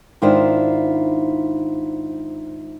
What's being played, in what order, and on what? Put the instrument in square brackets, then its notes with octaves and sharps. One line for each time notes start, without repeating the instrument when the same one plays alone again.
[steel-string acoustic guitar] G#2 D#3 D4 E4 F4 C5